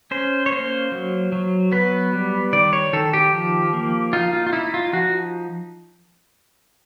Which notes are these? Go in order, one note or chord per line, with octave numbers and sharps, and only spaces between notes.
C#4 C5
C#5
A#3 C5
F#3
F#3
B3 B4
G3
D#3 D5
C#5
D#3 A4
G4
F3
A#3
D#4 F4
F4
F4
D#4 E4
F4
F3 F#4